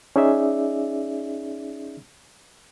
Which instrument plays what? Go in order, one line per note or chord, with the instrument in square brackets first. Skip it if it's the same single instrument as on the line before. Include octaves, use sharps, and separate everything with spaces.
[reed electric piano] C#4 D#4 G#4 D5 E5